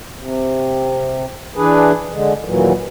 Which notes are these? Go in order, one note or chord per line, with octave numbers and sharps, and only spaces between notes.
C3
E3 D4 G#4 B4
D3 G#3
D#2 A#2 E3 F#3